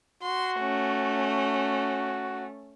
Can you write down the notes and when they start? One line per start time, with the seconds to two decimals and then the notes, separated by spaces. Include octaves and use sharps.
0.23 F#4 C6
0.58 A3 C#4